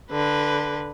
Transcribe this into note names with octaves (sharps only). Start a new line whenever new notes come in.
D3 B4